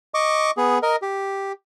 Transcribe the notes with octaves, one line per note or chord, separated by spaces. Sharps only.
D#5 C#6 D6
B3 G#4
A#4 D#5
G4